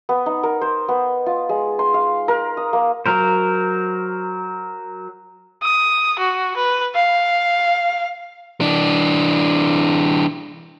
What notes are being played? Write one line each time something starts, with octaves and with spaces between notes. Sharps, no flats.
B3
D#4
A#4
C5
B3
F4
G#3
C6
F5
A#4
D#6
A#3
F#3 A#4 C5
D#6
F#4
B4
F5
E3 D4